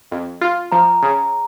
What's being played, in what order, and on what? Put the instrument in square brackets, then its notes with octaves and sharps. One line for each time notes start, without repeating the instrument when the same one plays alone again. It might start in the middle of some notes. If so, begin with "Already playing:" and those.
[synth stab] F2
F4
[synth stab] F3 [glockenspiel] A#5
[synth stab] C#3